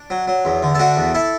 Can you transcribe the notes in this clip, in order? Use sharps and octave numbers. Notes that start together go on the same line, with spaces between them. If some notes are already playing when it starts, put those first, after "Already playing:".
Already playing: D4
F#3
F#3
E2
D3
A4
A3 D4 F#4
E2
E4 A4